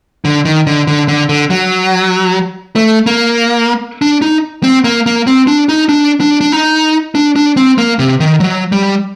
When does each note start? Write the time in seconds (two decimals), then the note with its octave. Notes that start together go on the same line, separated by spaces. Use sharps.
0.25 D3
0.45 D#3
0.67 D3
0.87 D3
1.08 D3
1.29 D3
1.50 F#3
2.76 A3
3.06 A#3
4.02 D4
4.22 D#4
4.63 C4
4.84 A#3
5.06 A#3
5.27 C4
5.47 D4
5.69 D#4
5.89 D4
6.20 D4
6.41 D4
6.52 D#4
7.15 D4
7.36 D4
7.57 C4
7.78 A#3
7.99 C3
8.20 D#3
8.40 F#3
8.72 G3